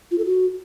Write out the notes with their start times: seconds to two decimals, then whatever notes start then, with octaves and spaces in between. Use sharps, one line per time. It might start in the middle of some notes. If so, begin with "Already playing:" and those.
0.11 F4
0.18 A4
0.25 F#4